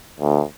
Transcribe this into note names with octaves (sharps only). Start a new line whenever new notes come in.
D2